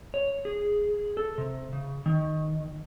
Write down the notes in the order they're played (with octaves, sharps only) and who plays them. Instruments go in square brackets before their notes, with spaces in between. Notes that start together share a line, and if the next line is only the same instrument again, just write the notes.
[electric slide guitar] C#5
G#4
A4
C3
C#3
D#3